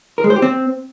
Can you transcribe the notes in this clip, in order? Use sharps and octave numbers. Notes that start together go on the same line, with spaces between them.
A#4
G#3
C5
G4
C4